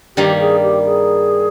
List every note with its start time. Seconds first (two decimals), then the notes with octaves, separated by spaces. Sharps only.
0.16 G2 D#3 G3 A#3 G4
0.40 G#4
0.63 G4
0.85 G#4